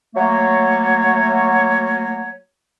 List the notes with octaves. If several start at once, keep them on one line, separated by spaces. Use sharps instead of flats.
F#3 A3 A#3 C#5